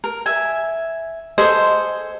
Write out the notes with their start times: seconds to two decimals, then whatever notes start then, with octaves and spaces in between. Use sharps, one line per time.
0.04 A#4
0.26 E5 G#5
1.38 G#4 A4 C5 D#5